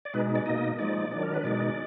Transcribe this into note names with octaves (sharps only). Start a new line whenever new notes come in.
D5
B2 G#3 D#4 B4
D5
B2 A#3 D#4 D#5
F3 G#3 D#4 D5
D#3 F#3 D4
A#4
B4
B2 G#3 D#4 D5